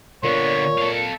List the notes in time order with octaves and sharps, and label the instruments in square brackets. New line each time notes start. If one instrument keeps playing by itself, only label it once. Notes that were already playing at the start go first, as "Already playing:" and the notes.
[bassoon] A#2 [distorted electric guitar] D3 B3 [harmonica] C#5
[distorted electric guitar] A4 F5